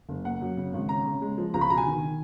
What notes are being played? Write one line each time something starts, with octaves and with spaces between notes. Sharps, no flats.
F#1
A#3 F#5
F#2
C#3
G#1
C#3 A#5
C#3
G#3
F3
C#2 A#5
B5
B2 A#5
G#5
D#3
D#3